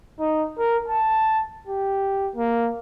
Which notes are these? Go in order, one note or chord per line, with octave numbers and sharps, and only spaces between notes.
D#4
A#4
A5
G4
A#3